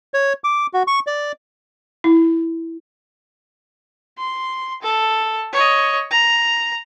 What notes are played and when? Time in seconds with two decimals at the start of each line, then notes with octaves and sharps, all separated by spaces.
0.14 C#5
0.44 D6
0.73 F#4
0.87 C#6
1.07 D5
2.04 E4
4.18 C6
4.82 A4
5.53 C#5 D#5
6.11 A#5